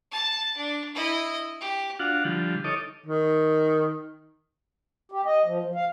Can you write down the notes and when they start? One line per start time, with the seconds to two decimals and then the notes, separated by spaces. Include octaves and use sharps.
0.12 A5
0.57 D4
0.95 E4 D#5
1.61 G4
2.00 D4 F4 F#4 F5 F#5
2.25 D3 F3 G3 F4
2.64 D#4 A4 C#5 D#5 D6
3.06 D#3
5.12 G4
5.26 D#5
5.45 F3
5.64 F3
5.75 F5